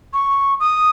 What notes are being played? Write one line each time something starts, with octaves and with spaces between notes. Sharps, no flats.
C#6
D#6